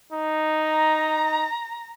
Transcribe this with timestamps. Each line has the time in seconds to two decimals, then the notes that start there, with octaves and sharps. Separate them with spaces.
0.12 D#4
0.65 A#5